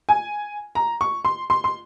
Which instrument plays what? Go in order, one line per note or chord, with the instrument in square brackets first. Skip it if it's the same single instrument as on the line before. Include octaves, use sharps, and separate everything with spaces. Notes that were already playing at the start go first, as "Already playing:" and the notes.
[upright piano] G#5
A#5
C#6
C6
C6
C6